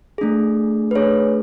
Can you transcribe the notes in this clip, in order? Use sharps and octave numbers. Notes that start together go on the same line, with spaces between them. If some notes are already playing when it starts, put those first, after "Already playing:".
A3 D4 G#4
B4
A3 D4 G#4 C#5